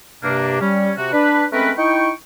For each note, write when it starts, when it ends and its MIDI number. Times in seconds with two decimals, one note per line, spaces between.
0.23 0.57 43
0.23 0.57 48
0.23 0.57 58
0.23 0.57 62
0.61 0.92 55
0.61 0.92 61
0.98 1.11 48
0.98 1.11 66
1.12 1.45 62
1.12 1.45 71
1.52 1.72 56
1.52 1.72 57
1.52 1.72 60
1.52 1.72 61
1.52 1.72 70
1.52 1.72 71
1.78 2.11 63
1.78 2.11 64
1.78 2.11 79
1.78 2.11 85